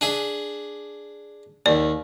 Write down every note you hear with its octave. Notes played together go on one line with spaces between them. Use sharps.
D4 G#4 E5
D#2 D5